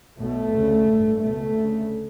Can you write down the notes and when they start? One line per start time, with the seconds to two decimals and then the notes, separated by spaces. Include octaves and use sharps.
0.19 B1 B2 A3
0.55 D2 C#3
0.88 A1 G2
1.22 C#2 B2 A3
1.56 D2 C#3